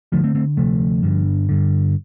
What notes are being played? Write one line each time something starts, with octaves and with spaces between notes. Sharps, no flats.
D2 D3 F3 A3
A3 C4
A3 C4
D2 C3 F3 A3
G1 G2 D3
G1 G2 D3